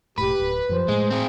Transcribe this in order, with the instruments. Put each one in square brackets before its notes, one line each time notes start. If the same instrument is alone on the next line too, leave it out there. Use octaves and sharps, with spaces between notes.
[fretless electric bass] E1 A2 [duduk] G4 [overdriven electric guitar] B4
[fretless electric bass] D1
[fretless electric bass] F#2 F3 [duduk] C5
[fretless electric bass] A2 A3 [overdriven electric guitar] G#3
[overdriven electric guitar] C4 G#4